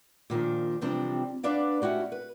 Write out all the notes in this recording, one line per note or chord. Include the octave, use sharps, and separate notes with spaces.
A#2 D#3 F3 D4
C3 E3 F3 G3 C4 D4
B3 D4 B4 D5 F5
C#4 E4 F#4 G4
B4